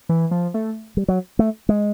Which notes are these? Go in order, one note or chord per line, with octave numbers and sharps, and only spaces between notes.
E3
F3
A3
G3
F#3
A3
G#3